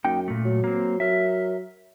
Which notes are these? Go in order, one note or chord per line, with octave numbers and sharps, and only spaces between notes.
F#2 A#3 D#4 G5
A#2 A3
F#3
A#3 C4
F#3 A#4 E5